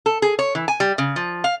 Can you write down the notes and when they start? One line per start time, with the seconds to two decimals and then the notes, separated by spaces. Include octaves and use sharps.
0.06 A4
0.22 G#4
0.39 C#5
0.55 E3
0.68 G#5
0.80 G3
0.98 C#3
1.16 F3
1.44 F5